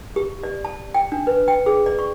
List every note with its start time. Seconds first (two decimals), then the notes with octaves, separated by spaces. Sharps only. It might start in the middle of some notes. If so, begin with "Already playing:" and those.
0.16 G4
0.43 D5
0.65 A5
0.94 G5
1.12 D4
1.27 B4
1.48 G5
1.66 G#4
1.86 D5
1.99 C#6